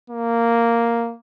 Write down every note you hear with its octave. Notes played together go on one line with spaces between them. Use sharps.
A#3